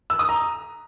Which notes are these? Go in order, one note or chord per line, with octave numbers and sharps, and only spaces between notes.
E6
D#6
A#5